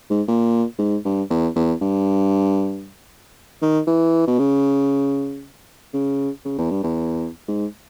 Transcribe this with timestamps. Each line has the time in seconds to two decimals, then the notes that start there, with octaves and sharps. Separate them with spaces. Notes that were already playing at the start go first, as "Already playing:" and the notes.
0.10 G#2
0.28 A#2
0.79 G#2
1.05 G2
1.30 E2
1.56 E2
1.81 G2
3.62 D#3
3.87 E3
4.27 B2
4.39 C#3
5.94 C#3
6.45 C#3
6.58 E2
6.71 G2
6.83 E2
7.48 G#2